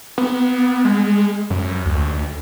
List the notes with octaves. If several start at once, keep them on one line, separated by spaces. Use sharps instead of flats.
B3
G#3
F#2
D2